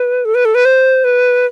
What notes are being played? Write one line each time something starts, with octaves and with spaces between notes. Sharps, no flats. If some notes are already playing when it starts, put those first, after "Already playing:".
Already playing: B4
A4
B4
A4
B4
C5
B4